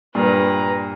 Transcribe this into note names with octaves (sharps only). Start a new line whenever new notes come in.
G2 A#2 B4 A#5